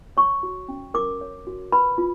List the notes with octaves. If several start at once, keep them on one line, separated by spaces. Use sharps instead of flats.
C#5 C#6
F#4
C#4
A#4 D6
C#5
F#4
B4 B5
F4